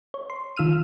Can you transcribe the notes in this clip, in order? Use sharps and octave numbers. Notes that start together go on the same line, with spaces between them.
C#5
C6
D#3 F4 E6 F6 D#7